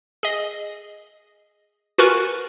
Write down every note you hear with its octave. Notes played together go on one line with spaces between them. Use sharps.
G#4 D#5
F4 F#4 A#4 B4 G#5 C#6